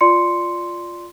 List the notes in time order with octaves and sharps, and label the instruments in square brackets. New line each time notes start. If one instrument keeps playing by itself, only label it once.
[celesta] F4 D5 C6 C#7